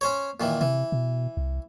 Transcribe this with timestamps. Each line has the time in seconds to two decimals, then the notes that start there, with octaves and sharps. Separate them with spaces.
0.01 C#4 C5 C#5
0.40 A#2 D#3 E3
0.61 C3 E3
0.92 B2
1.37 C2